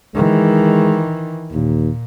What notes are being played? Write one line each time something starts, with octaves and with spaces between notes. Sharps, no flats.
D#3 E3 G#3
D#2 A#2